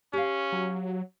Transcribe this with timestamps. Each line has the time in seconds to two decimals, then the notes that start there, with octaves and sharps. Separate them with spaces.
0.13 C#4 G4 F5
0.52 F#3